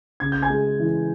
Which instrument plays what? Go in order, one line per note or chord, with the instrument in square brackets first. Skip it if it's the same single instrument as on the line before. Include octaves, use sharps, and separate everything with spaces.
[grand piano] C#3 G#6
G6
G#5 G#6
G#3
E3